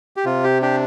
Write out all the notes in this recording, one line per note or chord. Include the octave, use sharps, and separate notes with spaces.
G4
C3 F4
G4
D4 G4